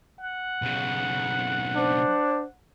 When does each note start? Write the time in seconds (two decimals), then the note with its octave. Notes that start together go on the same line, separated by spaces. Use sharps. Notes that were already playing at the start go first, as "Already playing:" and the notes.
0.20 F#5
0.62 B1 C#3
1.76 D4 C5